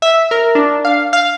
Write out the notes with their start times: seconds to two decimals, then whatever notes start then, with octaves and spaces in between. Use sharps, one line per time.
0.02 E5
0.31 A#4
0.55 D4
0.85 F5
1.13 F5